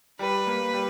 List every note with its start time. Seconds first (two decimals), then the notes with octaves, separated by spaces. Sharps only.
0.19 G3 B4
0.47 A#3
0.73 G3